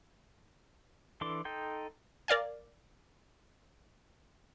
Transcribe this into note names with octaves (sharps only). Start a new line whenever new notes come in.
E3 D4 A4 C6 D6
D#4 A4 G5 C6
A#4 D5 F5 G#5